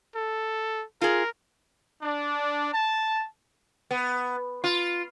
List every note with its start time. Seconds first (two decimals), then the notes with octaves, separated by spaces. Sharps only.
0.16 A4
1.01 F4 G#4 A#4
2.02 D4
2.73 A5
3.91 B3
4.64 F4